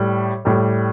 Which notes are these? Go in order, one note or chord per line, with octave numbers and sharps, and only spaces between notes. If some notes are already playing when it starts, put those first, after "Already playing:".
Already playing: A2 G3
A2 G3